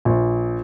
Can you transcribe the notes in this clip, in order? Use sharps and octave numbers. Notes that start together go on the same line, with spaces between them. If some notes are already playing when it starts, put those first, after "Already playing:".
A#1